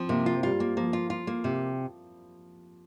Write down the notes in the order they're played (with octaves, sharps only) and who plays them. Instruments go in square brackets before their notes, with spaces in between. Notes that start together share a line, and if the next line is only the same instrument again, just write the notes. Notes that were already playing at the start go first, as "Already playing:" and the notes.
Already playing: [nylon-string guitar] F3 [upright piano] C4
[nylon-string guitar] C3 [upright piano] A#3
[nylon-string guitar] F4
[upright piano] G3 [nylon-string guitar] F4
[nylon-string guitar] A#3
[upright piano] F3 [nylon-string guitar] A#3
[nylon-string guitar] F4
F4
A#3
C3